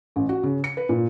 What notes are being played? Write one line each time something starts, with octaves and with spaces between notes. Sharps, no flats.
A1
F#4
C#3
C#7
B4
A#2